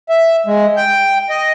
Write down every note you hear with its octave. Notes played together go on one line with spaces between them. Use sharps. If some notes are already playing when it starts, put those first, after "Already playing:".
E5
G#3
G5
D#5